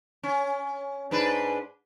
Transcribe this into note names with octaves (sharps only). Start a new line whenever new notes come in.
C#4
G#2 D4 B4